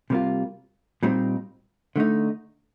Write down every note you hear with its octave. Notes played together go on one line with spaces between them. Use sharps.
C3 G3 A#3 F4
A#2 G3 C4 D#4
D3 A3 D#4